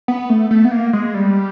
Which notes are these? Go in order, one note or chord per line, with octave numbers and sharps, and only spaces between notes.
B3
A3
A3
B3
A#3
G#3
G3